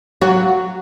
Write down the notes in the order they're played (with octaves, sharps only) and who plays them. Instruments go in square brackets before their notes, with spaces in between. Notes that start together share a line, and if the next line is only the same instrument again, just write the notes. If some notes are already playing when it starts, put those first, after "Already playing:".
[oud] F#3 F#4